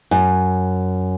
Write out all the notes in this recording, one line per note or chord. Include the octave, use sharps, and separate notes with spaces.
F#2